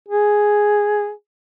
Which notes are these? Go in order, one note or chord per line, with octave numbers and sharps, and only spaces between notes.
G#4